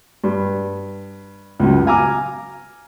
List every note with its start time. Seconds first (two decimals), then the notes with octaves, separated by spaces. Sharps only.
0.24 G2
1.60 C#2 F#2
1.86 F5 G#5 A#5 D6 F6